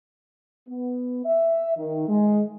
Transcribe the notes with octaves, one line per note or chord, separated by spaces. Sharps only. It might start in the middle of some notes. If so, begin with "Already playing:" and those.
B3
E5
D#3
G#3